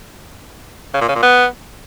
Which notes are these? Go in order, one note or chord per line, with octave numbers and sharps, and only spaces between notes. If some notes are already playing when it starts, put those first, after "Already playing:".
C#3
A#2
C#3
A#2
B3